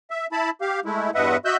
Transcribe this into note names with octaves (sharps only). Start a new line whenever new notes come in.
E5
E4 A5 B5
G4 F5
G#3 A3 E4
E2 G2 B4 D#5 E5 F#5
F#4 D#5 E5 E6 F#6 G6